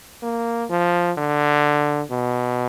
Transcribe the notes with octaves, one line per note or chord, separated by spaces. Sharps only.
A#3
F3
D3
B2